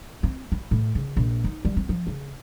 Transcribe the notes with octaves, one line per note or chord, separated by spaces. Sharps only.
C4
E4
A2
C#3
A#1
D#4
G3
C4
F3
C#3